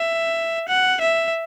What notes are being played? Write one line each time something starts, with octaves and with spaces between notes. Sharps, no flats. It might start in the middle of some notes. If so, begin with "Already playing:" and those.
Already playing: E5
F#5
E5